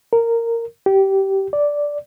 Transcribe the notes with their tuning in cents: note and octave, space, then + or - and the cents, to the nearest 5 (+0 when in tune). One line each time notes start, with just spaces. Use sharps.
A#4 -15
G4 -20
D5 -5